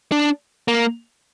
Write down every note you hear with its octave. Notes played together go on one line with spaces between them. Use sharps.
D4
A#3